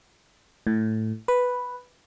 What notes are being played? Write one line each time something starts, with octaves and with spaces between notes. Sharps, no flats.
A2
B4